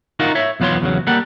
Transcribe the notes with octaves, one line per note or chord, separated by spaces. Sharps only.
D#4 F4 F#4 A#4
C#5 E5
B1 E2 B3 F4 C#5 C6
E2 C#3 F#3
G3 A#3 A4 F#5